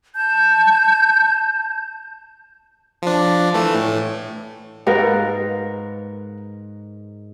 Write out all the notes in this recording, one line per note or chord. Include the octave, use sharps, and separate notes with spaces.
A5 G6
F3 D4
E3 A3
A2
G#2 A#4 B4 F5 F#5